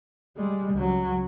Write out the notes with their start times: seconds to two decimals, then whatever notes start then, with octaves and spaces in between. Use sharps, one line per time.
0.37 G3 G#3
0.74 C#2 F#3